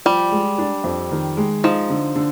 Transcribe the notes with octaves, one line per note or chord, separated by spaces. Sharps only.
F3 G3
G#3
D4
F2
D#3
G#3
F3 D#4
D3
D3